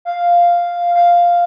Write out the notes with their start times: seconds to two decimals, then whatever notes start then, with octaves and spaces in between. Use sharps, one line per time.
0.05 F5
0.95 F5